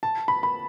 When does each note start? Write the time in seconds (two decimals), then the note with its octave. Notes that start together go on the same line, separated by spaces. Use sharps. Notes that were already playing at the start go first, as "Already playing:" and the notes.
0.03 A5
0.28 B5
0.43 B5